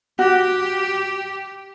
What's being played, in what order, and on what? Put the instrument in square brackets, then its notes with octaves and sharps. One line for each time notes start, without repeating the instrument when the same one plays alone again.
[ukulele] F#4 [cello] G4